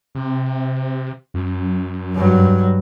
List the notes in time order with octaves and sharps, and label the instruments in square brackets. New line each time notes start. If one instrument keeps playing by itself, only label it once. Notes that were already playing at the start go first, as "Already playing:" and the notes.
[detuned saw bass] C3
F#2
[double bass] G2 F#3